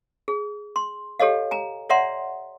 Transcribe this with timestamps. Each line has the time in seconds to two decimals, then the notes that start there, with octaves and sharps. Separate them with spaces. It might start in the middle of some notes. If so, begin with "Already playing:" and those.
0.28 G#4
0.76 C6
1.20 G4 A4 C#5 D#5 F5
1.51 G#5 A#5
1.89 C#5 D5 E5 F#5 A#5 C6